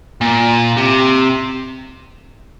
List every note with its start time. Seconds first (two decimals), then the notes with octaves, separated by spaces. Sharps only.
0.21 A#2
0.77 C3